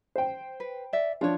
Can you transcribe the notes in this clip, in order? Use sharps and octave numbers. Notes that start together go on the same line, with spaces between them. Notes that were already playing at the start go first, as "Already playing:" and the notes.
C5 G5
B4
D5 E5
F3 D4 F4 C#5